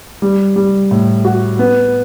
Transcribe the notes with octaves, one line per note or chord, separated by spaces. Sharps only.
G3
G3
A2
F#4
B3